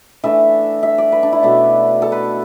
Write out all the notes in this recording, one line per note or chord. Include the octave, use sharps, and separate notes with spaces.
E3 A3 D4 E5
E5
D5
B4
D4
E4
B2 A3 D4
A4
B4